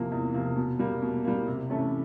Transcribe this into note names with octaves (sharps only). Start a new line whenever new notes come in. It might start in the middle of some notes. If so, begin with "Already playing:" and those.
Already playing: E2 C3 F3 A#3
E2
C3 F3 A#3
B2
G3 A#3
B2
G3 A#3
C3
E3 A3 C#4